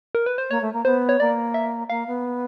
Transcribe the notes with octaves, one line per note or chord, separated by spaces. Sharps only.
A#4
B4
C5
A#3 C#5
A3
A#3
B3 C5
C#5
A#3 D5
E5
A#3 F5
B3